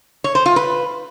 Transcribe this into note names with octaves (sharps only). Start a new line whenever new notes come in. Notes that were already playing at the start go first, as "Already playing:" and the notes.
C#5
C5
F4
B4